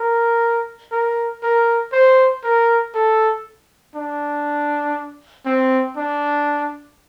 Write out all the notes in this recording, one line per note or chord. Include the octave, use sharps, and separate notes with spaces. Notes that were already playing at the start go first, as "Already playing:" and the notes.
Already playing: A#4
A#4
A#4
C5
A#4
A4
D4
C4
D4